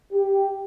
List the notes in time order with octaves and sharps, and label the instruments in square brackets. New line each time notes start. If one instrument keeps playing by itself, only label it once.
[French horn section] G4